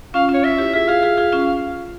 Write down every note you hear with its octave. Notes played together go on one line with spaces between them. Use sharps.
C#4 F4 F5
C#4 F4
C#5
C#4 F4 E5
E4 G4
F4 G#4 E5
F4 G#4 F5
F4 G#4
F4 G#4
C#4 F4